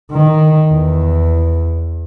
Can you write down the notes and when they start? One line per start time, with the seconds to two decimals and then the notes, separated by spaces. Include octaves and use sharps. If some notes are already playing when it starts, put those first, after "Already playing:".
0.12 D#3
0.71 E2